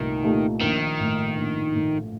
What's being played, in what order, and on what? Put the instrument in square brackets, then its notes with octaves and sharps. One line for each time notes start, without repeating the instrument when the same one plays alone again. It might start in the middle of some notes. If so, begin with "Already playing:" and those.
Already playing: [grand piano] C2 A#2 A3 [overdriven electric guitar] D#3
[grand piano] A#2 A3 D#4 G4
[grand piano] A#1 [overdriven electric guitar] D#3
[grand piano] A2 A3
A#1
A2 A3